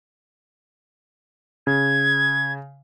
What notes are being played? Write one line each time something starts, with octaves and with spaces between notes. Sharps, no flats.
C#3 G#6